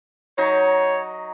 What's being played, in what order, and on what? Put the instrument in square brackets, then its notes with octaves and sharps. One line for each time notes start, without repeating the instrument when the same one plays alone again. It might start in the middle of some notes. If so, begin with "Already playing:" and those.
[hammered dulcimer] F#3 D#4 [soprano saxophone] C#5